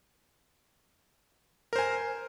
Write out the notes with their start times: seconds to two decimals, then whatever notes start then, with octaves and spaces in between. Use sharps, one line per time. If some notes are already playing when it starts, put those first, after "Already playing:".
1.73 A#4
1.76 C5
1.79 G#5